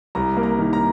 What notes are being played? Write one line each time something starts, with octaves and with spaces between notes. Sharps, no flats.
C2 A#5
A#3
A#5
D#3
A#5